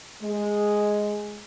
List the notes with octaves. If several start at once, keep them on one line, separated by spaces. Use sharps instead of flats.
G#3